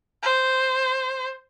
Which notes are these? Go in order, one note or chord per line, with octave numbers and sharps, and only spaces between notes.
C5